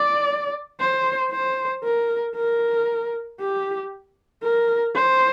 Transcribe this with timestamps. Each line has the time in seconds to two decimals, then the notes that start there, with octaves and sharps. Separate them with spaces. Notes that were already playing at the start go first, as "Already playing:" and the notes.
Already playing: D5
0.80 C5
1.32 C5
1.84 A#4
2.36 A#4
3.40 G4
4.44 A#4
4.96 C5